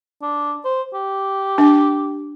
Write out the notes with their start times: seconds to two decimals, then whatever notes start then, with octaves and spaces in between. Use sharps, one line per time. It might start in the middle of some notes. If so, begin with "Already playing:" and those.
0.22 D4
0.65 C5
0.93 G4
1.58 D4